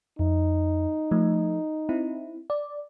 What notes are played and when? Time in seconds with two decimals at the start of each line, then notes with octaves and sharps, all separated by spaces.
0.19 F2 D#4
1.11 F3 A3
1.89 C4 E4
2.50 D5